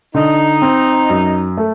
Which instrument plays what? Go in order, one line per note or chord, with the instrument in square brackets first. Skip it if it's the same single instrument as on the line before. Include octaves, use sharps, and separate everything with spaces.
[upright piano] D3 [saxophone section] D#4
[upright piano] C4
F#2
A3